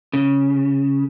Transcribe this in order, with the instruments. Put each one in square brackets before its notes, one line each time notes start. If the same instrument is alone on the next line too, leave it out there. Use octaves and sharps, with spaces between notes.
[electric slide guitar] C#3